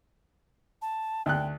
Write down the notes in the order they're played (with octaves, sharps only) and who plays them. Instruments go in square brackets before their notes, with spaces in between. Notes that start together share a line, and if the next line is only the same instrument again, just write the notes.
[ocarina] A5
[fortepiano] D2 F#6 [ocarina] G5